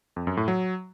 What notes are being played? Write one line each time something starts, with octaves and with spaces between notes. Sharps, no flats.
F2
F#2
A2
F#3